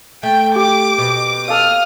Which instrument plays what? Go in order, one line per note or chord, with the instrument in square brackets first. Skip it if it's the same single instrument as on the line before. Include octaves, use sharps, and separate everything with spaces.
[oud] A3 [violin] G5
[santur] G4 [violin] D6
[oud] B2
[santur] A4 F5 [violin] D#6 F6